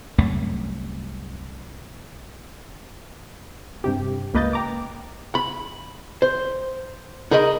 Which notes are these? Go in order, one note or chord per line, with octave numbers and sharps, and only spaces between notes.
C2 F#2 A3
G2 C3 G4
C#2 A#3 B4 D#5 G6 A6
G5 A#5 D6
B5
C5
D#4 G#4 A#4 D#5 B5